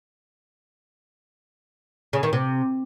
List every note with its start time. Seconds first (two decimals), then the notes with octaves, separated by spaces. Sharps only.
2.13 C#3
2.23 D#3
2.33 C3